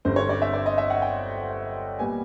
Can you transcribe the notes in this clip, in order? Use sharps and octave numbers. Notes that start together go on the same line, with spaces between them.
G1 G2 D3 G3 C4 C5
C#5
D5
E5
D5
D#5
E5
F#5
G5
A#2 G3 B3 G#5